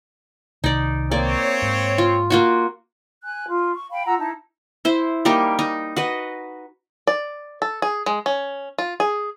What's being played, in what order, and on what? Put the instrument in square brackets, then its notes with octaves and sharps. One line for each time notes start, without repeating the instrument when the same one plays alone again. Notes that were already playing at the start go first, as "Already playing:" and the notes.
[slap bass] C2 C3 D#3 [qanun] D#4 D5
[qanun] A#3 D5 [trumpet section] C4 C#5
[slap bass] G#2
[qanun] F4
A#3 F4 F#4
[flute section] G#5 F#6
F4
C#6
F5 G5 B5
F4 F#5 A#5 E6
D#4 E4 A5
[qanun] E4 C5
G3 A#3 D#4 G4
D#4
F#4 B4 D#5
[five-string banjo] D5
A4
G#4
G#3
C#4
F4
G#4